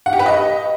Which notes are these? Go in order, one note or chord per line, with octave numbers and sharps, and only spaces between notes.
F#5
G4
B4
D#5